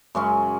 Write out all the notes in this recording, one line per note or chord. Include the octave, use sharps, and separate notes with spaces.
F#2 C#3 G#3 C#4